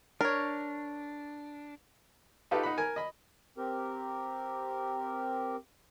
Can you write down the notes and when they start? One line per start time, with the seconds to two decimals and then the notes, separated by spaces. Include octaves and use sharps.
0.21 D4 A#4 C#5
2.51 D#4 F4 G4 A4 B4
2.63 D#4 F#5 B5
2.78 A#4 G#5
2.96 D#5 B5
3.58 C4 G4 A#4